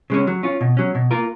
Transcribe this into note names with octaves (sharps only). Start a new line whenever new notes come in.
C#3 G#3 C#4
F#3
C#4 F4
B2
F#3 C#4
B2
A#3 F4 A#4